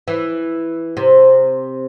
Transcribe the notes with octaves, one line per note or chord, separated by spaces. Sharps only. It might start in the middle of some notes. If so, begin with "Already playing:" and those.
E3
C3